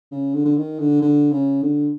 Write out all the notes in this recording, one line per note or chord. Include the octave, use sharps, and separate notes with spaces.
C#3
D3
D3
D#3
D3
D3
C#3
D3